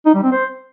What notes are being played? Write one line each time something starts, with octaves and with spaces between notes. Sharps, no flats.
D#4
G3
C4
C5